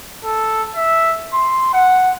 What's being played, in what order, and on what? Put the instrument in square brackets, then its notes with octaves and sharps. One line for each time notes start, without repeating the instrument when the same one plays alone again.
[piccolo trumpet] A4
E5
C6
F#5